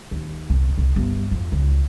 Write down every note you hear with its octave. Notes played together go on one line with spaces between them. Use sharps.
D#2
C2
C2
G1
F2
C#2